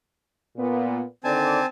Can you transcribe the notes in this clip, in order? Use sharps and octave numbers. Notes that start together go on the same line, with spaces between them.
A#2 B3
D3 D#3 C4 D5 G#5 A5